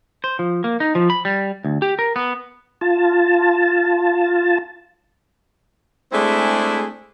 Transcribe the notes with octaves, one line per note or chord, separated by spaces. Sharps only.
C5
F3
A#3
D#4
F3
B5
G3
D2
G4
A#4
B3
F4 A5
G#3 A3 C4 D4 E4 G#4